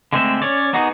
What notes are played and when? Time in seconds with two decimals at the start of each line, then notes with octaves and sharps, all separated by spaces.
0.13 D3 G#3 A3 C4 E5
0.42 C#4 C#5 D5
0.73 A#3 B3 D#4 F#4 G#4